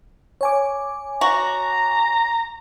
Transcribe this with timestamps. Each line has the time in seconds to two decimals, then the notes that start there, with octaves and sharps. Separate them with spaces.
0.41 C#5 G#5 D6
1.21 F#4 A#5